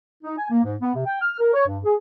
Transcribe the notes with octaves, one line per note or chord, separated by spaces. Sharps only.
D#4
G#5
A#3
G#2
B3
C3
G5
F6
A#4
C#5
G2
G#4